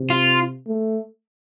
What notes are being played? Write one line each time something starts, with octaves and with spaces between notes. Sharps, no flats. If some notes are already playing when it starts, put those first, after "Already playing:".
Already playing: C3
F4
A3